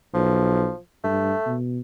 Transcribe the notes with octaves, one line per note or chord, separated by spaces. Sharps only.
B1 F3
G2 A3
B2